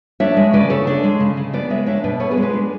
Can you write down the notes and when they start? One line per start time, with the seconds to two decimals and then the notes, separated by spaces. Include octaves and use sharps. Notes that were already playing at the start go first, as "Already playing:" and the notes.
0.20 D4 C#5 E5
0.37 G#3
0.53 C#3 B4 D5
0.70 C#3 A4 C#5
0.87 D4
1.04 G#3
1.20 C#3
1.37 C#3
1.53 B3 B4 D5
1.70 G#3 C#5 E5
1.86 D4 C#5 E5
2.04 B2 B4 D5
2.20 B3 A4 C#5
2.31 G#4 B4
2.37 G#3
2.42 G#4 B4
2.53 D4